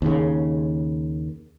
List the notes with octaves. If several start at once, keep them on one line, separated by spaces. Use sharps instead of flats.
D#2 C#3